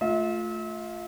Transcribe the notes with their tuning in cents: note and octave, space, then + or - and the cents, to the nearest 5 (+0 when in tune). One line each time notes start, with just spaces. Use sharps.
A3 +0 F4 +10 E5 -35